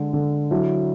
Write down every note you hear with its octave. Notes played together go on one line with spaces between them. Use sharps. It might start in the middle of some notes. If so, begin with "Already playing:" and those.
Already playing: D3 G#3
D3
F#3 E4